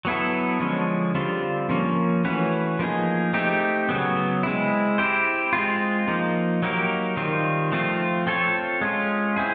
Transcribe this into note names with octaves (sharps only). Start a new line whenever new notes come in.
F#3 B3 E4 A4
D3 F3 G#3 C#4
D3 G3 C4 F4
F3 A#3 C#4
E3 A3 C#4 F#4 B4
F3 A#3 D#4 G#4
A3 C4 D#4 G4
C#3 F#3 B3
G#3 C4 E4
C4 E4 G4 C5
G#3 C4 F4
F3 A#3 D#4
F#3 A#3 D#4 G4 A#4
D#3 G3 C4 F4
F3 A3 C4 F4
C4 F4 A4 C#5
G#3 C#4 F4
C4 E4 G#4